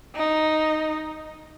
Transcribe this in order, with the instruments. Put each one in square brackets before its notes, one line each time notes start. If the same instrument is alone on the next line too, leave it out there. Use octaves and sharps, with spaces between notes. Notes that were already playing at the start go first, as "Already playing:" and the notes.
[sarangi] D#4